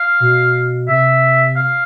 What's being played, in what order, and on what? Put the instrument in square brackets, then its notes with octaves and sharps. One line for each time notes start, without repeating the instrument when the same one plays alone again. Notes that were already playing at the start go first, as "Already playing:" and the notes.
Already playing: [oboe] F5
[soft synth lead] B2
[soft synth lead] C3 [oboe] E5
[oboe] F5